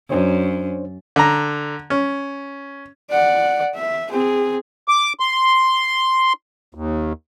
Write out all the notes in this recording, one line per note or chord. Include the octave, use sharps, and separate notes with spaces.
F#2 D4 C5 C#5
D3 A#5
C#4
D5 F#5
E5
C4 G#4
D6
C6
D#2